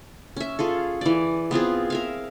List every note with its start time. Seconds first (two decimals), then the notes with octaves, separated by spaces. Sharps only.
0.37 C#4 E5
0.59 F4 G#4 A4
1.01 E3 D5
1.51 B3 C4 F4 G#4
1.90 A#4 E5 F5